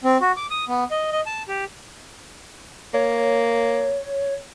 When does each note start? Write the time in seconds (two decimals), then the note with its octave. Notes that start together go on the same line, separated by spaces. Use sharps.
0.04 C4
0.21 F#4
0.37 D6
0.50 D#6
0.68 B3
0.91 D#5
1.12 D#5
1.26 A5
1.48 G4
2.94 A#3 C#5